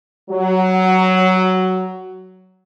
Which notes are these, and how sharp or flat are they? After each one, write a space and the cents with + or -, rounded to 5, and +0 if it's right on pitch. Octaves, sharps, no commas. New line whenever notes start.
F#3 +10